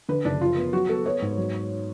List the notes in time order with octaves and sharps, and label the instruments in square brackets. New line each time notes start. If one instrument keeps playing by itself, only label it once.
[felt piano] D3 B4
F#1 D4
F3 F4
B3
F#3 F#4
B3 A4
B3 C#5
G#2
F#3